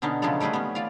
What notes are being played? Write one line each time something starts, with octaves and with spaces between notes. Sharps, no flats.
B2 D3 B3 C#4 D#4
C#3 F3 F#3 G#3 B3 A4
G3 A3 C4 G#4 B4
B3 C#4
F4 D5 F5